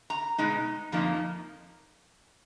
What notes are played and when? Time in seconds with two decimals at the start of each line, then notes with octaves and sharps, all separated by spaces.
0.10 A#5
0.38 B2 G#3 B3 D#4
0.92 F2 F3 A#3 D#4